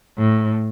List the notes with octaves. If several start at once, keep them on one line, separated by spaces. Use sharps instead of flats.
A2